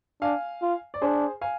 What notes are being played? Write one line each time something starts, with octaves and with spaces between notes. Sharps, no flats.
D4 F5 G#5
F4
D5
D4 G#4 C5
F5 G#5